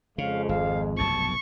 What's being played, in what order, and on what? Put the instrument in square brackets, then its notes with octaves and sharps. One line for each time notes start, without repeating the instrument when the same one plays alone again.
[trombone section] F2 G#3 [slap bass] C#3 [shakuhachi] F5
[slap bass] G#1 [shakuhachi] F5
[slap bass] F1 B1 G2 [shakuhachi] A5 [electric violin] C#6